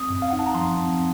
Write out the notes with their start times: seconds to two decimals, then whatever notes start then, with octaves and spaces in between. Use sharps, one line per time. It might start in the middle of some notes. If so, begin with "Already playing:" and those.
Already playing: C4 D#6
0.10 F#2
0.22 F5
0.31 D#4 F#5
0.39 A5
0.46 A#5
0.54 F3 C6
0.77 C4